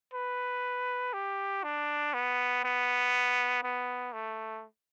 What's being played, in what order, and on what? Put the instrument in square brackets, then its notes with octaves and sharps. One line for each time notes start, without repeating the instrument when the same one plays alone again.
[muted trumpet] B4
G4
D4
B3
B3
B3
A3